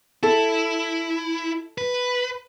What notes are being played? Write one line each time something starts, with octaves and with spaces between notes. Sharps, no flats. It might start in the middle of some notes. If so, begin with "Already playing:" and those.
E4 A4
B4